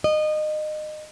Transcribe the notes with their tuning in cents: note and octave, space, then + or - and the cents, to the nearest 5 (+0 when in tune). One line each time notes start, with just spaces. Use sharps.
D#5 -25